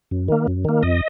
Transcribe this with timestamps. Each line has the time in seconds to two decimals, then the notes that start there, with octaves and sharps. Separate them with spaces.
0.11 F#2
0.28 D#3 A#3
0.47 F#2
0.65 D#3 A#3
0.83 F2 D#5